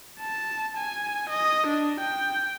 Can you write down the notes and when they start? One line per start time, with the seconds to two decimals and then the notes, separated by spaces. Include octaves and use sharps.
0.19 A5
0.77 G#5
1.29 D#5
1.67 D4
2.00 G5